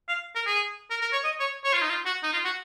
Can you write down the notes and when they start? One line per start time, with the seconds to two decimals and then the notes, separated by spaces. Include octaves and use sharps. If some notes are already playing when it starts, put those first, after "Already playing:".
0.08 F5
0.36 A#4
0.46 G#4
0.91 A#4
1.02 A#4
1.13 C#5
1.24 D#5
1.40 C#5
1.65 C#5
1.73 F4
1.82 D#4
1.90 F4
2.06 F#4
2.23 D#4
2.33 F4
2.45 F#4